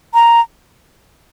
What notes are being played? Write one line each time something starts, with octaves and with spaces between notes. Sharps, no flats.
A#5